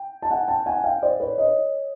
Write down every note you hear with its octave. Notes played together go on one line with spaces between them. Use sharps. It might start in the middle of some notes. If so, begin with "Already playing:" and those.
Already playing: G5
A5
F#5 G#5
G5 A5
F#5 G#5
F5 G5
C5 D5
B4 C#5
C#5 D#5